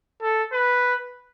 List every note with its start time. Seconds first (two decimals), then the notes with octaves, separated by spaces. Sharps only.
0.22 A4
0.53 B4